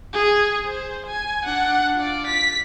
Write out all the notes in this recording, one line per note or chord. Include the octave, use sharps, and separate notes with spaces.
G#4
C5
G#5
D4 F#5
F4 D5
B6